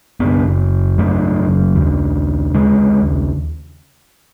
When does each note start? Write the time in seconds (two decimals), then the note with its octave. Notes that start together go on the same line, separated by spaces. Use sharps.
0.20 F#2 C#3 B3
0.98 F#2 C#3 A3
1.76 D#2 C#3
2.54 D#2 C#3 G#3